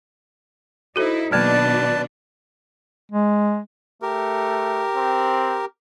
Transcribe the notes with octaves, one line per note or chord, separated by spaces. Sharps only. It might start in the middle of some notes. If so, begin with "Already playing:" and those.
D#4 E4 F#4 A4 C5
B2 D#3 F#3 A#3 D4 B4 D5 A5
G#3
A3 G4 A#4
C4